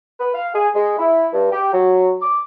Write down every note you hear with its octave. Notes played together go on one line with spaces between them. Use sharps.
B4
F5
G#4
G#3
E4
G2
G4
F#3
D6